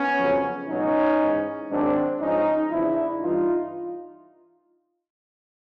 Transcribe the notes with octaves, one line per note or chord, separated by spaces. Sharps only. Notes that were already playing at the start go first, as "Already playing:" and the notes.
Already playing: B3 C#4
F2 C#3 F#3
C#2 B2 F#3 C#4 D#4
G#2 E3
G#2 D#3 F#3 C4 D4
G#2 F3 C#4 D#4
E2 C#3 F3 D4 E4
G2 E3 D#4 F4